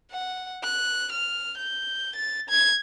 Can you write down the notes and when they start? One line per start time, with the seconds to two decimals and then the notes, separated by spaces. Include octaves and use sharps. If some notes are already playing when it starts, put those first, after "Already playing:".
0.11 F#5
0.63 F#6
1.12 F6
1.57 G6
2.15 A6
2.49 G#6